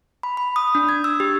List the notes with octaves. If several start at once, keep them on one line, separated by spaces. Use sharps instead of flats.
B5
B5
D#6
D4
G#6
E6
G4